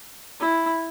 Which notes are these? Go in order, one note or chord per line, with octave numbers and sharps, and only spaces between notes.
E4